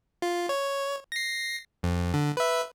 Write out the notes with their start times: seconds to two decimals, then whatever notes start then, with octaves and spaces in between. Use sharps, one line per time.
0.22 F4
0.49 C#5
1.12 A#6 C7
1.83 F2
2.14 D3
2.37 B4 E5